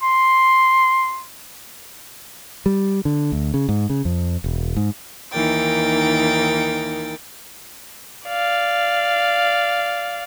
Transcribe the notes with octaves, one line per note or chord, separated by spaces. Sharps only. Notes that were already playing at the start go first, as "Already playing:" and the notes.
C6
G3
D3
D2
C#3
G#2
C#3
F2
E1
G#2
D#2 E3 D#4 A#4 G5 A6
D5 F5